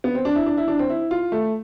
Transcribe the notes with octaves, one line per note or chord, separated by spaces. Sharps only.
B3
C4
D4
E4
D4
E4
D4
C4
E4
F4
A3